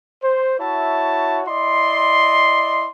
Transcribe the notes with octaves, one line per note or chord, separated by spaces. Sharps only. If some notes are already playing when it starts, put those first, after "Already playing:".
C5
E4 F#4 C#5 E5 A5
E4 D5 D#5 C6